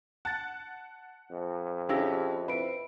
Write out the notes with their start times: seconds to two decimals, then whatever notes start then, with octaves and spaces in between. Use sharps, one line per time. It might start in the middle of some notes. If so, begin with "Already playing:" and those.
0.25 F#5 A5 F#6 A6
1.31 F2
1.89 C#4 E4 G4 G#4 F5 E6 A#6
2.48 C4 E4 B4 B5 D7